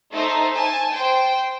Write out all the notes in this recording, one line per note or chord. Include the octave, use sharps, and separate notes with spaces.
A3 D#4 C5
G#5 A5
C5 G5